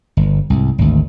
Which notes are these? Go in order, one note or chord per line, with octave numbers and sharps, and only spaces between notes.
G1
C2 G#2
G#1 D2